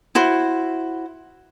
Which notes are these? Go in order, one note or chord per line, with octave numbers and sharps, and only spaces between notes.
E4 F#4 C5